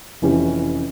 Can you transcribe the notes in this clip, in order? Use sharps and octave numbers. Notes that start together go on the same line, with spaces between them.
F1 E3 C#4 G4